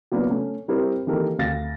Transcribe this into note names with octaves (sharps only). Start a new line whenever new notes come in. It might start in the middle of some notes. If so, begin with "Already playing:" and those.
F#3 A#3 B3 D4 E4
A3 C#4
G3 C4 E4 G4 A#4 C5
D#3 E3 A#3 G4 A4 A#4
D2 F5 A6 A#6